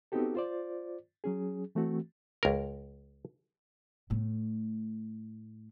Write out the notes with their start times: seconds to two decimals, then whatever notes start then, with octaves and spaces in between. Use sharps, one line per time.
0.12 B3 C4 D#4 F#4 G4 A4
0.35 F4 C5 D5
1.24 F#3 C#4 G#4
1.75 E3 A3 C4 F#4
2.43 C#2 A#4
4.10 A2 A3